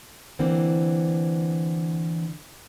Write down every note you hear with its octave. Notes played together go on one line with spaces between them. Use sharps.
D3 E3 A#3 C4